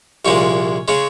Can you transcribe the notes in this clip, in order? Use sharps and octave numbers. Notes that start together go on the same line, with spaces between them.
C2 A#2 F3 G#3 C#4
C#3 G#3 C#4